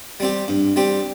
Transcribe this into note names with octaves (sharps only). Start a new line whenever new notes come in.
G3 C4 G4
G2
G3 C4 G4